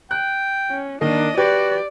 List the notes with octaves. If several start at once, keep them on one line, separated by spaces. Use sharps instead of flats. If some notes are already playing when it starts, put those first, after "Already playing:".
G5 F#6
C#4
D#3 A#3 D4 D#5
F#4 G4 B4 D5